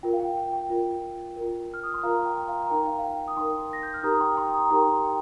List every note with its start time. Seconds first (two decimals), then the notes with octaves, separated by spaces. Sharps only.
0.03 F4 A#4 G5
0.13 F5
0.20 G5
0.37 G5
0.53 G5
0.70 F4 A#4
1.36 F4 A#4
1.74 F6
1.83 D#6
1.94 C6
2.03 F4 A#4 F5 A#5
2.25 G5 C6
2.48 F5 A#5
2.66 A#5
2.70 D#4 A#4 G5
2.87 F5
2.99 F5
3.03 G5
3.28 D#6
3.37 D#4 A#4 G5 C6
3.73 A#6
3.83 G6
3.94 F6
4.03 D#4 G4 A#4 A#5 D#6
4.15 D#6
4.20 G5 C6
4.36 G5 C6
4.53 A#5 D#6
4.66 A#5
4.70 D#4 G4 A#4 G5 C6
5.04 G5